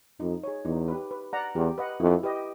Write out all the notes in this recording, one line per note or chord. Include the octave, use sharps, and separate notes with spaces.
F2 D#4
G#4 C#5
E2 D#4
G4 B4
B4
D5 F#5 A#5
E2 G4
B4 D#5 F#5
F2 E4
G4 B4 D#5